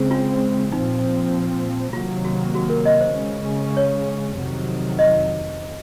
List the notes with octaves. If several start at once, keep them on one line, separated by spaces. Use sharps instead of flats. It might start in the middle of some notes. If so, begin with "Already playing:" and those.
Already playing: C#3 G#3 C4
F4
A#2 F3 C4 D#4
C3 D#3 F#3 A#3 F4
F#4
F#4
A#4
D#5
C5
C#3 G#3 C#4
C#5
F2 C3 D#3 F#3
D#5